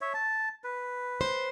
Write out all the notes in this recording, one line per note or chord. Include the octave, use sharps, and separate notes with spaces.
C#5 E5
A5
B4
C5